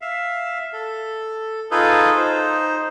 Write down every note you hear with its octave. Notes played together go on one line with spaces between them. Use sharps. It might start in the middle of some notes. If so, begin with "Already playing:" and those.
E5 F5
A4
D#4 F4 G#4 A4 B4
D#4 C5